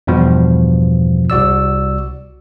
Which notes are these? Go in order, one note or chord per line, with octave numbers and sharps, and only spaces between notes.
E2 G2 B2 F3
C2 F#4 D5 E6